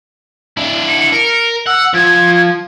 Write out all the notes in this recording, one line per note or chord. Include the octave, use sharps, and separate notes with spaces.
D4 E4
C#7
A#4
F#5 E6
F3 G#6